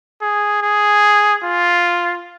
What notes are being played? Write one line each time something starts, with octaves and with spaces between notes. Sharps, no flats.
G#4
G#4
F4